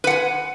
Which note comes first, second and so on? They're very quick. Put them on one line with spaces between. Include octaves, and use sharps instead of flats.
B4 F#5 G#5